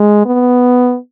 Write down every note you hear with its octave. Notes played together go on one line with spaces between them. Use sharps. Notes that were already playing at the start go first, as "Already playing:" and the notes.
Already playing: G#3
B3